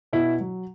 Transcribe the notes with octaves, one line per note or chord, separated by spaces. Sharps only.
B2 E4
F#3